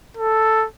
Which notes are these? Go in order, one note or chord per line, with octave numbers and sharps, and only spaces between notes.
A4